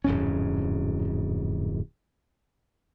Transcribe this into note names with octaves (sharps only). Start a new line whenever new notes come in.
D1 F2 G#2 C#4